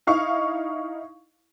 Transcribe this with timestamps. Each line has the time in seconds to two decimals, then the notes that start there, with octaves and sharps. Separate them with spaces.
0.07 D#4 E4 F5 C#6